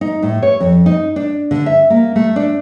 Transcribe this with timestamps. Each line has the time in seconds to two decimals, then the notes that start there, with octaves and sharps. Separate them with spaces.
0.01 D#4
0.23 A2
0.42 C#5
0.60 F2
0.86 D#4
1.16 D4
1.51 D3
1.66 E5
1.90 A#3
2.16 A3
2.36 D4